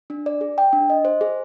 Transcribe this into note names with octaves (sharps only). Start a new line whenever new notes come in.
D4
D5
G#4
G5
D4
D#5
C5
G#4